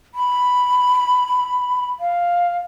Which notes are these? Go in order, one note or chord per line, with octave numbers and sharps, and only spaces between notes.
B5
F5